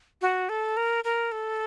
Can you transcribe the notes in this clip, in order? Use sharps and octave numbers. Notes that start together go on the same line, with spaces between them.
F#4
A4
A#4
A#4
A4